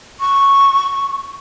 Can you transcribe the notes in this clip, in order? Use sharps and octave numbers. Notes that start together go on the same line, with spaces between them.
C#6